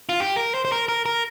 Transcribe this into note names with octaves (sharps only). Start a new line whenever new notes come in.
F4
G4
A#4
C5
C5
A#4
A#4
A#4